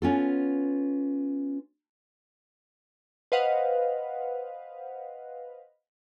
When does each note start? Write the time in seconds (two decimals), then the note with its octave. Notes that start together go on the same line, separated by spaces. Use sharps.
0.02 B3 C#4 F4 A4
3.32 B4 C5 D#5 F5 F#5